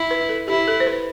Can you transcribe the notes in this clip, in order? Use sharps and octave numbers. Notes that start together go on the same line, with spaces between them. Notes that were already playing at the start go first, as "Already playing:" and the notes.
Already playing: E4
B4
A4
E4 G4
A4
C5
B4